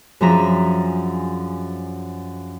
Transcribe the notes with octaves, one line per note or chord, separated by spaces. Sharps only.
F#2 F3 D4 G#4 E5 A#5